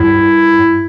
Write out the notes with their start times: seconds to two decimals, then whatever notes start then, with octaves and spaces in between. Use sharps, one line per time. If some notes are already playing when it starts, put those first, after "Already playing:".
Already playing: G2 E4